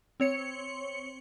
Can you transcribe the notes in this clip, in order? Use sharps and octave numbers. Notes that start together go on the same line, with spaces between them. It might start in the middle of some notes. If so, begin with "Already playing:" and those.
C4 C#5 C#7